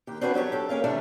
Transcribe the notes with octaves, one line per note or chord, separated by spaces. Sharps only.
D#2 G4
C4 D4 F#4 B4 C#5
F#3 D4 G4 C#5
G4 A4
A#3 C#4 G#4 F5
C3 E3 G3 A3 D4 G4